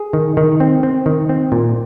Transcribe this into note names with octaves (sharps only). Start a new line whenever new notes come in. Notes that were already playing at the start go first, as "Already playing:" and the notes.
Already playing: G#4
D#3
D#3
C4
C4
D#3
C4
A#2